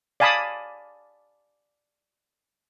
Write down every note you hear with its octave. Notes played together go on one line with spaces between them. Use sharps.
D5 F5 G#5 A5 B5 D#6